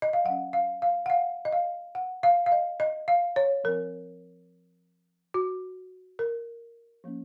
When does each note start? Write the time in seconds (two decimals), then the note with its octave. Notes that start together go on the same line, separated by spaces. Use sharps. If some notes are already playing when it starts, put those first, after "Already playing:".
0.02 D#5
0.13 F5
0.25 F#3 C#4 F#5
0.53 F5
0.82 F5
1.06 F#5
1.10 F5
1.45 D#5
1.52 F5
1.95 F#5
2.23 F5
2.46 F5
2.52 D#5
2.80 D#5
3.08 F5
3.36 C#5
3.64 F3 C4 A#4
5.34 F#4
6.19 A#4
7.04 F3 A#3 C#4